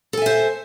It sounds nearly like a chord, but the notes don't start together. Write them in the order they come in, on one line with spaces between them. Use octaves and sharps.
A4 G#5 E5 C5